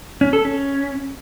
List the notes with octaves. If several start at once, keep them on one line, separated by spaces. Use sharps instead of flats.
C#4
A4
C#4